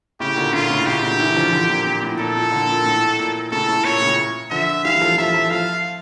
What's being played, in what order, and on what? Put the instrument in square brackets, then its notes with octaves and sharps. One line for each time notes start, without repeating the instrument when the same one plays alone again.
[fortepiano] A2 C#3 [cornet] G4
[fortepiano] A#2 D3
[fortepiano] A#2 D3 [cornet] F4
[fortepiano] A2 C#3
[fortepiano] A#2 D3 [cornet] G4
[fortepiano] A#2 D3
C#3 E3
D3 F3
D3 F3
A#2
A#2
A2
[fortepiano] A#2 [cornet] A4
[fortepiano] A#2
A#2 D3
A#2
A2
A#2
[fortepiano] A2 C#3 [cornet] A4
[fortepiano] A2
[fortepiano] A#2 [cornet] C#5
[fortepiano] A2 C#3
[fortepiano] D3 F3 [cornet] E5
[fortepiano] E3 G3 [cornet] F5
[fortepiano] F3 A3
[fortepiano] F3 A3 [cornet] E5
[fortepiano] F3 A3
[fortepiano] F3 A3 [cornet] F5